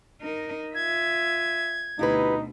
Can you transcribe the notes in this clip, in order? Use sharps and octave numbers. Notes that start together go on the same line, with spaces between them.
D#4 A#4
F4 E5 G#6
D2 B2 D#4 E4 G4 B4